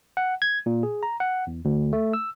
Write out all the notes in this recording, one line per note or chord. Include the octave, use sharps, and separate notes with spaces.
F#5
G#6
A#2
G#4
A#5
F#5
E2
D2
A3
E6